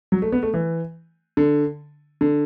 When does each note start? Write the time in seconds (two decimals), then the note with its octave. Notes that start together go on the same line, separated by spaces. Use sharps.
0.12 F#3
0.22 A3
0.32 B3
0.43 A3
0.54 E3
1.37 D3
2.21 D3